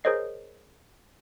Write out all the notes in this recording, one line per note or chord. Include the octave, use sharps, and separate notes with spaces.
G#4 A#4 C5 C#5 D#5 C7